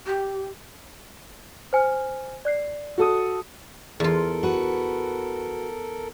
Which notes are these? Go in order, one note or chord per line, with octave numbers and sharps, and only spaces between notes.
G4
C5 G#5 F6
D5 F#6 C7
F#4 A4 D#6
E2 F4 A4 A#4
F#4 B4